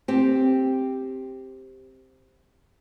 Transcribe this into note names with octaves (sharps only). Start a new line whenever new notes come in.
C4 G4